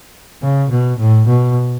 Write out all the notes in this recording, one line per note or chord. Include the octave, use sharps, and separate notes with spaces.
C#3
B2
A2
B2